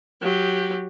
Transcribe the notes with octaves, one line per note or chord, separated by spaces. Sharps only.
F#3 G4